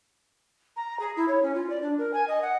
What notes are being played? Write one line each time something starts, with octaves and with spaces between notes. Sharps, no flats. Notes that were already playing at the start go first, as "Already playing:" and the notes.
A#5
G#4
E4
C#5
C#4
F4
D5
D4
A#4
G#5
D#5
F#5